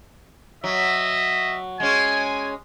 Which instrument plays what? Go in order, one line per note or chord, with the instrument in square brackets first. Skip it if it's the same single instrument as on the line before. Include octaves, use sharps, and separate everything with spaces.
[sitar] F#3 [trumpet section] D#5 E5
[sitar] G#3 C#4 [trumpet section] G#5